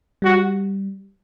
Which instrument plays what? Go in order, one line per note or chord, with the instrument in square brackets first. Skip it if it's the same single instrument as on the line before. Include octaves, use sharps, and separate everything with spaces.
[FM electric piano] G3 [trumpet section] F#4